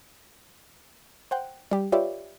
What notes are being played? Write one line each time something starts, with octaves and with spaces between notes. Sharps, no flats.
C5 F#5 G5
G3 G4
F4 G4 B4 C#5 D5 E5